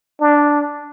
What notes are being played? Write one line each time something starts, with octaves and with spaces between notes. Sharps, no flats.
D4